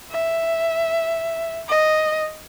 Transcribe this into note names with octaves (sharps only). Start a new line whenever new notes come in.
E5
D#5